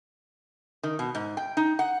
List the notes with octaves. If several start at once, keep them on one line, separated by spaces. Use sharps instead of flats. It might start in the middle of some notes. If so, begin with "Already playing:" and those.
D#3
B2
G#2
G5
D#4
F#5